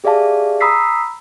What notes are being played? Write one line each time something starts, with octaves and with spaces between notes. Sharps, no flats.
G4 G#4 D5 E5 F5 A5
A#5 B5 D#6 E6 B6 C7